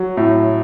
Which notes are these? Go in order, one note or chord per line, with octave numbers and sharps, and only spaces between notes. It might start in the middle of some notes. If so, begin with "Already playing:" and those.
Already playing: F#3
A2